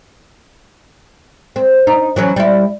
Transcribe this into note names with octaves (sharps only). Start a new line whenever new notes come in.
C4
D#4
E3 F#3 C#4
G3 E4